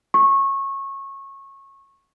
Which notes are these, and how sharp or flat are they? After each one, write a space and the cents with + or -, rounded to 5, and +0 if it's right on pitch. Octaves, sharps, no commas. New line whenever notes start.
C#6 -20